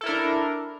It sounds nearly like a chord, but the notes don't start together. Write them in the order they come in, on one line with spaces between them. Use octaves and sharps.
A4 E4 A#4 D4